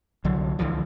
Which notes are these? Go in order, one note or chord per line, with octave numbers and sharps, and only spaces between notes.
C2 D3 F#3
C#2 D3 E3 F3